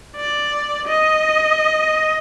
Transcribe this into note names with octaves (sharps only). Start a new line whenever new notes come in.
D5
D#5